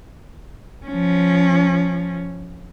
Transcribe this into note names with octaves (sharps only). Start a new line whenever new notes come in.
F3 C#4